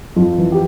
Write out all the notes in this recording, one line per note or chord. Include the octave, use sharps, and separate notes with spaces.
F2 F4
E3
G4